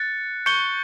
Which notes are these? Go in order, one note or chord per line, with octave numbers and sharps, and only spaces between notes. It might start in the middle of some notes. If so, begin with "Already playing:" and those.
Already playing: F#6 A6 C#7
C#6 G6 C#7 G7